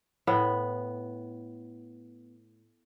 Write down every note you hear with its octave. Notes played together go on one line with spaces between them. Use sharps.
A2 B3